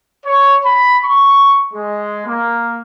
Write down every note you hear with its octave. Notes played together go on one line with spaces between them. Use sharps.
C#5
B5
C#6
G#3
A#3